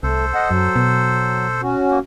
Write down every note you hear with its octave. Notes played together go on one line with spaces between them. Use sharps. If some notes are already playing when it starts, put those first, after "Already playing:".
C2 A3 A4 C5
D#5 F#5
F#2 F#3
B2
C#4 F#4
A#3